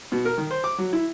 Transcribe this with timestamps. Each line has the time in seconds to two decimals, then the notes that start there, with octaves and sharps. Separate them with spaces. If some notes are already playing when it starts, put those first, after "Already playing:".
0.12 B2
0.25 A#4
0.38 D#3
0.51 C5
0.64 D6
0.78 F#3
0.93 E4